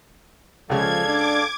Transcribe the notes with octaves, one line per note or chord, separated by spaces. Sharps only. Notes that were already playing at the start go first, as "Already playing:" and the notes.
C#2 C#3 F3 G#3 A4 D5 F5 G#6
D4 D6 G#6